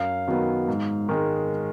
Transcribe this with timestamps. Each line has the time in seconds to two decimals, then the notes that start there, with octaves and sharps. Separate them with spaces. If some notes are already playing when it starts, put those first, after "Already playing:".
Already playing: F#2 F5
0.28 D#3 F#3 B3
0.68 G#2
1.09 D#3 G#3